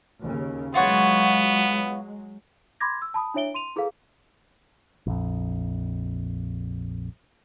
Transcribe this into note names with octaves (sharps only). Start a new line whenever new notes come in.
D#2 C#3
F#3 G#3 B3 F4 F#4 C#5
B5 C6 D6 G#6 A#6
E6
A5 B5 D#6
D4 E4 C#5 E5 D7 G7
C6 D#7 F7
E4 G#4 A4 B4 F5
A#1 F2